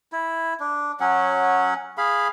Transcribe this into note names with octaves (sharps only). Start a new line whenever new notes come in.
E4
D4
F#3 C#4 F#5
G#4 F5 B5